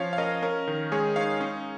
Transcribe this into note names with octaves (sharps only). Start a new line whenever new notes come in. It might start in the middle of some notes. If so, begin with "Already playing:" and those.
Already playing: F3 C#4 C#5 F5
F5
C#4 A#4 D#5
C#4 A#4
D#3
G#3 G#4 C#5
D#4 C#5 F5
C#4